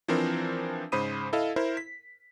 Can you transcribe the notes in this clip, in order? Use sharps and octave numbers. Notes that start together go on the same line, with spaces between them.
E3 F3 C4 D4 A#4 C5
G#2 C#3 C5 B5 D#6 D#7
E4 A4 D#5 F5
E4 A#4 C5
B6